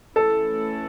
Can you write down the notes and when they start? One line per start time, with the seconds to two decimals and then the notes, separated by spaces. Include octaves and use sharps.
0.15 E3 A3 C#4 E4 A4